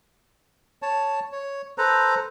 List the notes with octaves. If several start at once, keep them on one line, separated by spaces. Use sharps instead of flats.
C#5 A5
C#5
A4 B4 C5 A#5